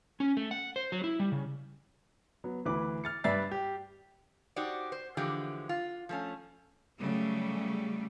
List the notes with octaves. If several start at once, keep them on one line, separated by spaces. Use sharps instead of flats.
C#4
A3
F#5
C5
F#3
E4
G3
C#3
F#3 B3
D2 E3 B4 D6
F6 A6 C#7
G2 B4 D5 E5 A6 C7
G4
D#4 F#4 G4 C5 D5
C5
D3 E3 F3 G#3 G4
F4
F3 A3 C#4
C#3 F#3 G3 A3